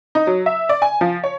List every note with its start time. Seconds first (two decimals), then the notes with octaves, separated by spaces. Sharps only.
0.15 D#4
0.27 F#3
0.46 E5
0.69 D5
0.82 G#5
1.01 F3
1.24 C#5